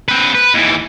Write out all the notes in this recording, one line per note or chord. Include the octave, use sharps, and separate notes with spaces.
C4 B4
B4
D#2 E3